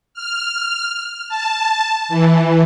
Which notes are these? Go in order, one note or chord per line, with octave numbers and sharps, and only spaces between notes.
F6
A5
E3